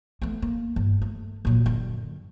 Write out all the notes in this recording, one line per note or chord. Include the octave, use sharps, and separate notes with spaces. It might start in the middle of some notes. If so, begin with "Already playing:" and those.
A3 B3
A#3
G1
A3
A#2 F#3
F#2 D3